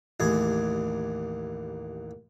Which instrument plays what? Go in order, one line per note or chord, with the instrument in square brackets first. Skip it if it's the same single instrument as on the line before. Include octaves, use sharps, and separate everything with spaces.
[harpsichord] A1 D#2 G#4